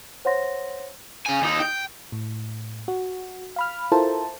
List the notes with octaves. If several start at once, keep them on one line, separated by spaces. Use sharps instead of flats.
C5 C#5 F#5 C6 A#6
C#3 G#5
D#2 D#4
G5
A2
F#4
F5 B5 F6
E4 F4 A4 A#4 C5 A5